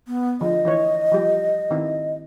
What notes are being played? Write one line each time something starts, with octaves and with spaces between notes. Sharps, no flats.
B3
D3 F3 D#5
E3 E4 C#5
F3 G3 G4
D#3 C4 E4